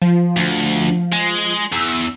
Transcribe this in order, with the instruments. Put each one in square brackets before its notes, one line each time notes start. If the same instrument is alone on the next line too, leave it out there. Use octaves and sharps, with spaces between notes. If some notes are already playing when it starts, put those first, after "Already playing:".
[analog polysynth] F3
[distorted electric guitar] D2
G#3
[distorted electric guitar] E2 [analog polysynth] E6